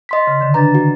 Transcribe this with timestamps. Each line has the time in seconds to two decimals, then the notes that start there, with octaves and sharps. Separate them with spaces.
0.09 D#5 C6 B6
0.27 C#3
0.41 D3 D#3
0.54 D#3 D4 B4 A#5 A6
0.75 F#4